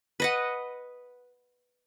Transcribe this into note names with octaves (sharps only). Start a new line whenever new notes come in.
B4 D#5 F#5